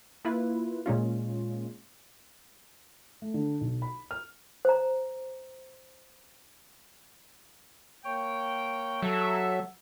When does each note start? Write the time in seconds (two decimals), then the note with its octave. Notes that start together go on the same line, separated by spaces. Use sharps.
0.25 A#3 E4 F4 B4
0.86 A#2 G#3 C#4 F4
3.22 A3
3.34 D3
3.61 B1
3.82 B5
4.11 F6
4.65 C5 A#5
8.05 A#3 C#5 G5
9.02 F#3 A4 E5